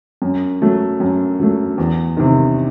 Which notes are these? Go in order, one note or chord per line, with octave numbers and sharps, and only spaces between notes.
F#2
F#3 A3
F#2
F#3 A3
E2
C3 D#3